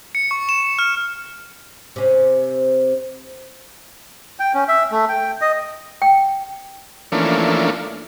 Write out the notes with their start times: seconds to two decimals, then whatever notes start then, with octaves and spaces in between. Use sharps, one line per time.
0.15 C#7
0.31 C#6
0.49 E7
0.79 F6
1.96 C3 C#4
4.40 G5
4.54 C#4
4.68 E5
4.91 A3
5.09 G5
5.41 D#5
6.02 G5
7.12 E3 F3 A3 A#3 C#4 D4